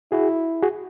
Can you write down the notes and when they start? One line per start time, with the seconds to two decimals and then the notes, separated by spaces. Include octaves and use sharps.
0.12 E4 F#4 G#4
0.62 F#4 G#4